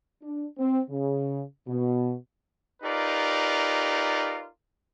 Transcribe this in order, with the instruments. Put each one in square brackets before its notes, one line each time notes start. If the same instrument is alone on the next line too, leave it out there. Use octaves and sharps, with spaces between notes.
[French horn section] D4
C4
C#3
B2
[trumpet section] D#4 F4 G4 A#4 B4 D5